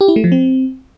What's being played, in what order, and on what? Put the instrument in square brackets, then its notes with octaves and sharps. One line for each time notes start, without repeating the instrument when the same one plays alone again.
[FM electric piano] G4
E4
A3
F3
C4